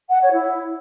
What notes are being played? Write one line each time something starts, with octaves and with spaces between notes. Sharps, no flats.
F#5
C#5
E4